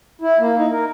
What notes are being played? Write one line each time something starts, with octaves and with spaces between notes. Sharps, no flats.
E4
A#3
D#4
A#4